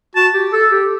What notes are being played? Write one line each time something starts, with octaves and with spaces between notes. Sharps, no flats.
F#4 A5
G4
A4
G4